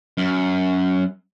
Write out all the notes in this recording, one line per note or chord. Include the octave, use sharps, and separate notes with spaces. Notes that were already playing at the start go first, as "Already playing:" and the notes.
F#2